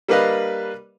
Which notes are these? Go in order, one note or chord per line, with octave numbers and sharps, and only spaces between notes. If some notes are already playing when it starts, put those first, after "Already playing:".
G3 A#3 D4 B4 D#5 F5